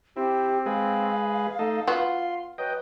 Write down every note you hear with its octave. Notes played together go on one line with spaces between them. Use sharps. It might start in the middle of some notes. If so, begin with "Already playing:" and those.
C4 E4 G4
G#3 G#4 B4 F5
A3 D#4 A4 D#5
B3 F4 F#4 C6
F#3 B4 D#5 G5